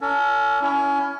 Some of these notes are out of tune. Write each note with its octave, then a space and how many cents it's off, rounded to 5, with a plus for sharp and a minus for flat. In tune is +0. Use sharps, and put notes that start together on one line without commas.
C#4 +40 A4 +45
C#4 +25 E4 +5